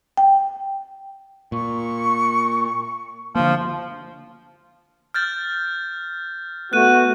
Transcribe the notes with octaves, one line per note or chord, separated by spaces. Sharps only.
G5
A#2 C#6
D3 F3 A#3
F6 G6 A6
A3 B3 F#4 F#6 D#7